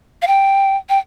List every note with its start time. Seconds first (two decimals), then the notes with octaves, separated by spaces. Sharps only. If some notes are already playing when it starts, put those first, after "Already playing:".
0.22 F5
0.27 G5
0.89 G5